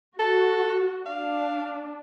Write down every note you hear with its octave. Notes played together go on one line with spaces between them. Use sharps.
F#4 A4
D4 F5